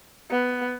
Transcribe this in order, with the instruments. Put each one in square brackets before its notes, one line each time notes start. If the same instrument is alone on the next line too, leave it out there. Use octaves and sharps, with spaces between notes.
[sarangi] B3